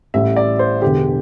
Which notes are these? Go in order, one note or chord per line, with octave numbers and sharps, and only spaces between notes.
A1 A2 G3 E5
D5
C5
E1 E2 D3 G4